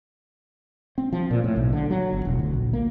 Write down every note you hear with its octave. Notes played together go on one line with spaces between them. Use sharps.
C4
F3
A#2
A2
B1
D3
F#3
G1
E1
D2
A#1
A#3